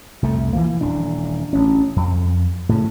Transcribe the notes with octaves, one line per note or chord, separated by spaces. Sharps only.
C2 F2 A3
E3 F3 A#3
D#1 E3 D4
A1 C#4
F2
A2 C#3